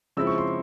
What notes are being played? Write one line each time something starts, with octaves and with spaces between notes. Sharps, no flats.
C#3 F3 G#3 C4 E4 E6
C#6
C6